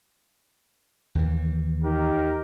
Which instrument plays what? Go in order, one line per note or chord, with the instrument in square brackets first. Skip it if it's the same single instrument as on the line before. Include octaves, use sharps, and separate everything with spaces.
[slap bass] D#2 E3
[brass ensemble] D#4 G4 A#4